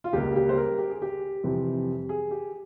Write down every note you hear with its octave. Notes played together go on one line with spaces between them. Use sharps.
F4
C#2 C#3 G3 A#3 G4
G4
C5
A#4
G4
G#4
G4
F2 C3 E3 G3 C4
G#4
G4